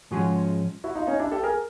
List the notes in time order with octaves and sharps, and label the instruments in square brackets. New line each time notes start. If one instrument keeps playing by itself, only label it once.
[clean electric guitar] G#2 F3 G#3 C#4 [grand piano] F#4 G#4
[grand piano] E4 F#4
D#4 F4
C#4 D#4
D4 E4
G4 A4
G#4 A#4